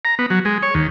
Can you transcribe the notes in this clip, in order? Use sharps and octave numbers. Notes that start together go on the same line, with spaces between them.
A#5
B3
F#3
G#3
C#5
D#2